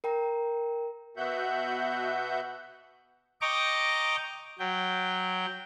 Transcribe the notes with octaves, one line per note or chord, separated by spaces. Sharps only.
A#4 G5 A#5
B2 B3 F#4 E5 F#5 G6
D#5 G5 A#5 C#6 D6
F#3 G5